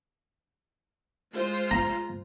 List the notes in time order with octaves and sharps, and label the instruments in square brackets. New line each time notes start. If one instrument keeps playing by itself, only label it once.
[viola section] G#3 F4 C5
[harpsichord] A#5